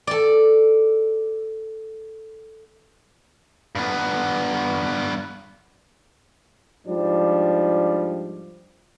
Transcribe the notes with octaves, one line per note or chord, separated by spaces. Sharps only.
A4 D5
G2 B3
G#2 F3 G3 D4